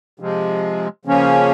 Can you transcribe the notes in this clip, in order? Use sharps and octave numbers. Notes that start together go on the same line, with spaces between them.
C3 F3 G#3
C#3 F3 A#3 C#4